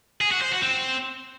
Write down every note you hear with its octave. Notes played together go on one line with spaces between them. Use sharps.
G#4
F#4
C5
F#4
C4